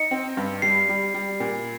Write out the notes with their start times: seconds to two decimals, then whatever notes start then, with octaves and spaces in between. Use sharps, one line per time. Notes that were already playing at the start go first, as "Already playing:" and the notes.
Already playing: D#4 C#7
0.11 C4
0.37 G2
0.62 G3 C7
0.89 G3
1.14 G3
1.40 A#2